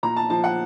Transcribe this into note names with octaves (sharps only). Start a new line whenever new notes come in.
A#2 A#5
A5
F3 A5
F#5